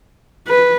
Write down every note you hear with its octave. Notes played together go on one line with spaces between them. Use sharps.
B4